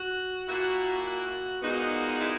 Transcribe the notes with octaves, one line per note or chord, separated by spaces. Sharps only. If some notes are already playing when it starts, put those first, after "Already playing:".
Already playing: F#4
A#2 A#3 E4 F#4
F#4
A#2 G#3 B3 D#4 F#4
E4